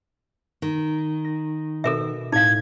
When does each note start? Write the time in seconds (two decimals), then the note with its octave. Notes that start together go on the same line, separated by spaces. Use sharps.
0.62 D#3
1.24 A#6
1.84 B2 A4 A#4 E5
2.32 A2 D#4 F5 G#6